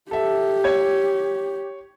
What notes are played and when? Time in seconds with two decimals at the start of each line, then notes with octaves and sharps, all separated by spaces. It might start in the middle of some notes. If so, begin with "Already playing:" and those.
0.11 G4 A4 E5
0.64 C#5 G#6